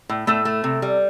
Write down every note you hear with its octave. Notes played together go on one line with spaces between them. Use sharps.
A2
A2 A3 A4
A3
C3
G3